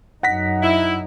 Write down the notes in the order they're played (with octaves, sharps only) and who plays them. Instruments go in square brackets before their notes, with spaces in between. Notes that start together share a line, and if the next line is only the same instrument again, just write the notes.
[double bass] F#2 D#4 [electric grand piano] F#5 A#6 B6
[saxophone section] E4